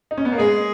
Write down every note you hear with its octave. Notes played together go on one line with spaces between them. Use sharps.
D#4
C#4
B3
A#3
G#3 G#4